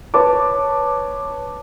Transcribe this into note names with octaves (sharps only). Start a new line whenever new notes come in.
B4 C#5 A5 D6